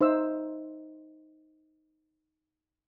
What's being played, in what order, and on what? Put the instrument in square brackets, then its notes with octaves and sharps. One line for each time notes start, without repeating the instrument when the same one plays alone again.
[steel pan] D#4 C5 E5 E6